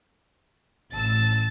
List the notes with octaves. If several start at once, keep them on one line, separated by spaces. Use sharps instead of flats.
A1 A5 E6 A6